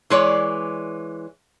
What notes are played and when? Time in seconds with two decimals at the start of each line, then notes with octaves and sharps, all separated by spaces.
0.10 E3 G#3 C#5 D5